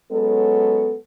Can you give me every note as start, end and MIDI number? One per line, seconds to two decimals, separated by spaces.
0.12 0.96 54
0.12 0.96 56
0.12 0.96 59
0.12 0.96 61
0.12 0.96 69